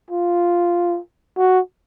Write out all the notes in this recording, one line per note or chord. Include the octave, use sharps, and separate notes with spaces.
F4
F#4